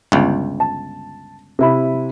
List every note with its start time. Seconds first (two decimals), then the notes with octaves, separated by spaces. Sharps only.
0.12 G1 C#2
0.60 A5
1.59 C3 E4 B5